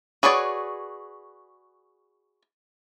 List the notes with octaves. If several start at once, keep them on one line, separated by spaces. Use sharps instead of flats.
F#4 G#4 B4 C#5 D5